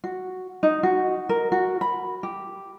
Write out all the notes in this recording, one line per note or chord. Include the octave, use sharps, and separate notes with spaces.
F#4
D#4
F#4
A#4
F#4
B5
G4